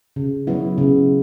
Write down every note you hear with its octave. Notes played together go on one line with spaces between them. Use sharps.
C#3
F#3 B3 E4
C#3